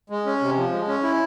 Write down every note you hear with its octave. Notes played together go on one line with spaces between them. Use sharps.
G#3
C#4
C3
F3
G#3
C#4
E4